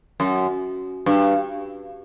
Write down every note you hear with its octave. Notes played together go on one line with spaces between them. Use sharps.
F#2
G2